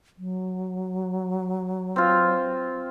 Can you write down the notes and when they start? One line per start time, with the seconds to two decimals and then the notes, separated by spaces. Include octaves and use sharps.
0.18 F#3
1.96 C4 F4